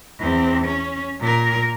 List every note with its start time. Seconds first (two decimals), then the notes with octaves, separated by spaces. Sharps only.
0.20 E2 C4
0.65 C#4
1.20 A#2 A#4